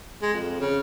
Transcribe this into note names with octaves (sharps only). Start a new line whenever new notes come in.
G#3
F2
C#3